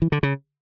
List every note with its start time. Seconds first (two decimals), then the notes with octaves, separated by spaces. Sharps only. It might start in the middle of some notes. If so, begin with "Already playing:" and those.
0.02 E3
0.12 D3
0.23 C#3